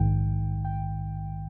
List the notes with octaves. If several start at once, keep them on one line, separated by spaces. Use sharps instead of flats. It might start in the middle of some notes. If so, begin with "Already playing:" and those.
Already playing: A#1 G#2 D#3 G5
G5